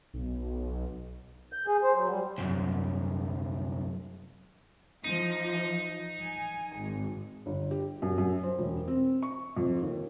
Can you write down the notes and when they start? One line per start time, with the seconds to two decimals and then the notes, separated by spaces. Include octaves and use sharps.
0.14 B1
1.52 G6
1.67 G#4
1.83 C5
1.95 F#3
2.08 G3
2.38 C2 F#2
5.04 F3 D#4
6.22 G#5
6.78 G#1
7.46 G1
7.71 G4
8.02 F#2
8.18 F#2
8.43 C5
8.59 E1
8.88 C4
9.23 C#6
9.56 F2
9.82 D#2